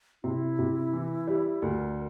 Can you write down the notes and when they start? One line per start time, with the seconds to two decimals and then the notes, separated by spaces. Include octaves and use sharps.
0.24 C3 E4
0.59 C3
0.93 E3
1.27 G3
1.62 D2 A#4